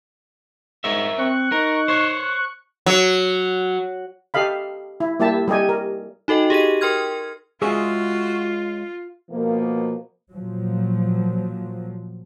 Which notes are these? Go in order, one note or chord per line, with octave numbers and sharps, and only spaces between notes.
G#2 A#4 C#5 E5
C4 C#6 F#6
D#4 A#4
C5 C#5
F#3
G4 A4 D#5 F5 B5
E4
G3 A#3 E4 G4 E5 A5
G3 G4 A4 D#5 G#5
A#4
D#4 F#4 A4 D#5 G5
G4 G#4 D#5 D#7
A#4 G5 C6 F6 G#6
G#3 C#4 F4 F#4 G#4 E5
B2 F3 A#3
A#2 F3 F#3